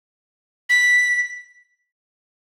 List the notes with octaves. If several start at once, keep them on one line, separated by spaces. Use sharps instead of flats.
B6